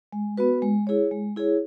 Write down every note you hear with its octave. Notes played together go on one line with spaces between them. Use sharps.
G#3
B3 F#4 B4
G#3
E4 G#4 C#5
G#3
E4 G#4 C#5